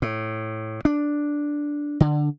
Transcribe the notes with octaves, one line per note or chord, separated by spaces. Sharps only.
A2
D4
D3